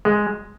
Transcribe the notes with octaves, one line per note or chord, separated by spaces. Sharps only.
G#3